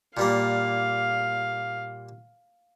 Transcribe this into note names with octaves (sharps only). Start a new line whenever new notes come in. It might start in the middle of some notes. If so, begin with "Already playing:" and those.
A#2 G3 A#3 F5